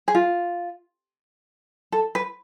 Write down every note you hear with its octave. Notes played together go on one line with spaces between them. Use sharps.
G#4
F4
A4
B4